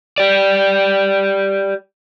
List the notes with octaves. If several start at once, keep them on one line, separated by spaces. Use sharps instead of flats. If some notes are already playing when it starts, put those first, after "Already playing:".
G4 D5